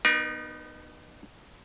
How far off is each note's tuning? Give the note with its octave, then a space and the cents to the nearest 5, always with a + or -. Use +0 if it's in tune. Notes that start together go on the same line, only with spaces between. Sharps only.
B3 -5 D#4 -30 A#4 +35